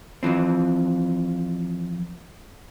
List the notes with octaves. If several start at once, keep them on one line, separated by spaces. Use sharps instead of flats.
F2 E3 F3 C4